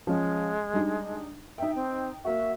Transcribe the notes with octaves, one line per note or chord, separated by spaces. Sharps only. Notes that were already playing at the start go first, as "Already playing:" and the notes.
F3 G#3 C#4
G3 D4 D#4
D#4 E5 G5
C4
A#3 F#4 E5